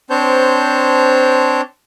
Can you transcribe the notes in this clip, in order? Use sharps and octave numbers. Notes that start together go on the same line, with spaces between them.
C4 D4 C5 C#5 A5 G6